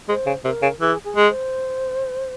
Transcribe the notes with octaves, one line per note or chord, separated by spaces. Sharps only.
G#3 C5
C#3
C3 A#4
C#3
E3 G#4
G#4
G#3
C5